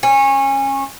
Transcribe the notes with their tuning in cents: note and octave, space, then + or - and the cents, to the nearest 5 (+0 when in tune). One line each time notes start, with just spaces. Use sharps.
C#4 -25